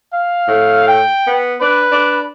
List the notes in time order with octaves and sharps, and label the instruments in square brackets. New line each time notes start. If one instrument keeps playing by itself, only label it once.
[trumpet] F5
[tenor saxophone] A2
[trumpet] G5
[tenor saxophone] B3
[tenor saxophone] D4 [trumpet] B4
[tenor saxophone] D4